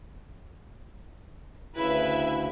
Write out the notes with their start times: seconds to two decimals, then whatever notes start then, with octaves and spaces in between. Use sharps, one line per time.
1.76 D2 C#3 E4 B4 E5